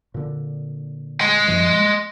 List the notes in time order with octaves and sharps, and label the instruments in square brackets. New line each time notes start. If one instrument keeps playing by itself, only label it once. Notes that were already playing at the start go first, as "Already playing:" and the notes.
[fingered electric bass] A#2 D3
[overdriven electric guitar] D#5 C6
[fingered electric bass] F#2 A#2 F3
G#3